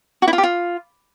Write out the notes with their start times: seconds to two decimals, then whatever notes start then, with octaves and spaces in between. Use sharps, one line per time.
0.22 F#4
0.28 E4
0.33 F4
0.38 G4
0.43 F4